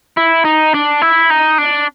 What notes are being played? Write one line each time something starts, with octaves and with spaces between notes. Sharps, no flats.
E4
D#4
D4
E4
D#4
D4